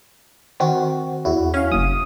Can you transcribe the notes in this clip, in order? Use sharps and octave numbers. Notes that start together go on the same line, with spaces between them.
D#3 C4 F#4
E2 E4 F#4
C#4 C#5 F5
F#1 D#6